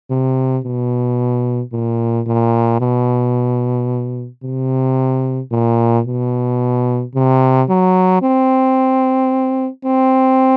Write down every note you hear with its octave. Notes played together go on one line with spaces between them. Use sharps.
C3
B2
A#2
A#2
B2
C3
A#2
B2
C3
F#3
C4
C4